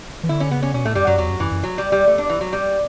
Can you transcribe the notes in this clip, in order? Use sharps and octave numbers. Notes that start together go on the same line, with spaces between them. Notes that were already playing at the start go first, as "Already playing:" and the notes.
E3
D3 E4
C#4
C#3 B3
C#4
B2 C#4
A2 A3
F#2 G3
F#2 F#3
E2 F#3
F#2
F#2 E3
F#2
F#3
G3
G3
A3
D4
E3
F#3
G3